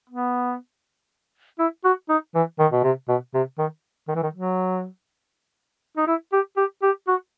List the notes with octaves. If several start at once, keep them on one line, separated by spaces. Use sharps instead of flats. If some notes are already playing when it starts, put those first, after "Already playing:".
B3
E4
F#4
D#4
E3
D#3
B2
C3
B2
C3
D#3
D#3
E3
D#3
F#3
D#4
E4
G4
G4
G4
F#4